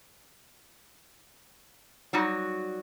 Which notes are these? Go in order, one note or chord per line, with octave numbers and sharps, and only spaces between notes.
F#3 G3 D#4 F#4